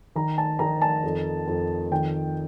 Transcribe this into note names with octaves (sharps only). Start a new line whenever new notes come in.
D#3 A#5
A5
D#3 A#5
A5
F2
F2
D#3 G5